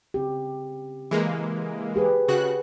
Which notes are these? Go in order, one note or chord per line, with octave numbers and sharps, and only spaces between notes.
C#3 C4 G4
E3 G#3 A#3
G4 G#4 B4
C#3 F#4 F#6